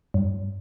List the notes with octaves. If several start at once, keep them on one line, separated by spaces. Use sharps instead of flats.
G2